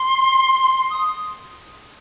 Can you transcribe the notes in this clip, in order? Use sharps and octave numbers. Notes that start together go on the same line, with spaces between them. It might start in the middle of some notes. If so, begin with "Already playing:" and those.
Already playing: C6
D#6